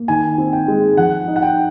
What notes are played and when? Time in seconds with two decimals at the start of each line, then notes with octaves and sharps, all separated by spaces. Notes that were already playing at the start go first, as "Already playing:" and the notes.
Already playing: A#3
0.08 D#3 G#5
0.38 C4
0.53 G5
0.68 G#3
0.97 F3 F#5
1.28 D#4
1.36 F#5
1.42 G5